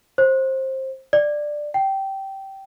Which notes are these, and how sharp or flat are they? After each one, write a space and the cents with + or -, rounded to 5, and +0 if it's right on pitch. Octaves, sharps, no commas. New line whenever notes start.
C5 +20
D5 +10
G5 -15